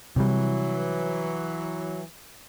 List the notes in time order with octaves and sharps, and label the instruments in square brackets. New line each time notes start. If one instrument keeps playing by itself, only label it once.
[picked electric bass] C3 G3 [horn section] E3 F#3